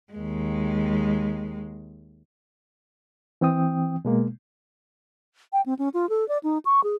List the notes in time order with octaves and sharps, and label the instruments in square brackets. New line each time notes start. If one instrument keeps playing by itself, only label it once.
[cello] D#2 G#3
[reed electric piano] E3 C4 G5 D#6
B2 G#3 A#3
[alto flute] G5
C4
C#4
F4
A4
D5
D#4
C#6
G#4